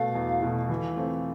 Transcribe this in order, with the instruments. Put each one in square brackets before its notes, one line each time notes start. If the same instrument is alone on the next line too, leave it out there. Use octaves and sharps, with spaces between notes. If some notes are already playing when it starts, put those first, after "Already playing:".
Already playing: [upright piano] B2 A3 [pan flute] F5
[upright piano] E2
B2 A3
E3
A3 C4 F4